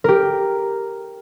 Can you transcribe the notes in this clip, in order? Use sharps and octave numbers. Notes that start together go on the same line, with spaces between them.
G4 A#4